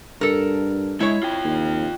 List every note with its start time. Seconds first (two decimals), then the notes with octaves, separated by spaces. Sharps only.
0.21 G2 A4 A#4
1.00 G#3 E4 C#5
1.23 F4 G5
1.44 D#2